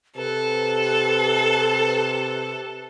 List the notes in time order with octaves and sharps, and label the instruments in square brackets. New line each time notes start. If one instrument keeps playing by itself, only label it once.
[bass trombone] C3 [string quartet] A4 [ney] B4